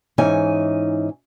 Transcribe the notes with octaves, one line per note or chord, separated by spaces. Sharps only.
G#2 E3 C#4 D#4 G#5